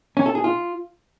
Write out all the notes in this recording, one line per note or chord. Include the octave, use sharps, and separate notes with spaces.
C#4
A4
G#4
F4